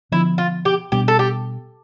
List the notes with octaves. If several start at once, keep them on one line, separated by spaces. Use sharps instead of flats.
D3 F3 B3 E4
F4
G4
B2 G3 B3 D4 G4
A4
G4